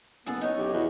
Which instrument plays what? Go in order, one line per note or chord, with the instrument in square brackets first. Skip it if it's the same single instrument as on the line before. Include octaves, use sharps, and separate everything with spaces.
[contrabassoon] F#1 [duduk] B3 [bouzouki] G#4 A4
[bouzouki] D#4 C#5
[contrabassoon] B1 [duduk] G4
[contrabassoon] E2 [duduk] F#4